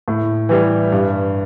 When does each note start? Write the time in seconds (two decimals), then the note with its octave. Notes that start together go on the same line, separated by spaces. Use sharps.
0.08 A2
0.49 E3 G3
0.92 G2